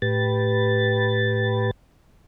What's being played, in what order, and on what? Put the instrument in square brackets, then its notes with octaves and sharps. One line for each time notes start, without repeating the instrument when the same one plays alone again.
[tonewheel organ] A2 G4 B4 A6